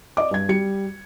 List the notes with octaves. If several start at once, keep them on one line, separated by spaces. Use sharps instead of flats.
D5 D#5 D6
G2 G#6
G3 C#7